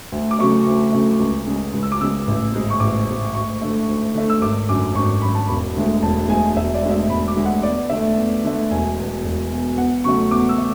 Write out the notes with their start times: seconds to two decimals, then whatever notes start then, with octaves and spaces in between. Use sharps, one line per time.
0.12 D2
0.31 D6
0.39 C#3 F#3 A3 C#6
0.66 D2
0.92 C#3 F#3 A3
1.19 C#2
1.46 C#3 G#3
1.73 C#2
1.83 E6
1.92 D6
2.00 C#3 G#3 E6
2.27 A1
2.53 G#2 G#3
2.70 C#6
2.80 A1 D6
3.07 G#2 G#3
3.34 D2 C#6
3.62 D3 A3
3.88 D2
4.14 D3 A3
4.30 E6
4.41 G#1 D6
4.69 F#2 D3 D6
4.95 G#1 C#6
5.22 F#2 D3 B5
5.35 A5
5.47 E1 B5
5.76 D2 D3 G#3
6.02 E1 A5
6.29 D2 D3 G#3 G#5
6.56 E1 E5
6.74 D5
6.82 D2 D3 G#3
6.91 E5
7.09 E1 B5
7.28 D6
7.37 D2 D3 G#3
7.46 F#5
7.63 E2 D5
7.89 D3 A3 E5
8.17 E2
8.44 D3 A3
8.71 E1 G#5
8.98 E2 B2
9.24 E1
9.51 E2 B2
9.77 E2 F#5
10.04 C#3 F#3 A3 C#6
10.31 E2 D6
10.49 E6
10.58 A3